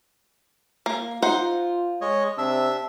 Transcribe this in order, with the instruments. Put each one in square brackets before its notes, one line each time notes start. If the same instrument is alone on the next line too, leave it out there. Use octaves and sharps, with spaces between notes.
[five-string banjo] A#3
[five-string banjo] D#4 C5 F#5 [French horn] F4
[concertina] G#3 C#5 D#5
[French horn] C3 [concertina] D4 E5 E6